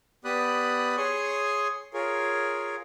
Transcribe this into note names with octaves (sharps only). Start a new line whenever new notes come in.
B3 G4 D5 B5 D#6 F#6
G#4 C#5 C6 C#6 D#6
F4 G#4 A#4 C#5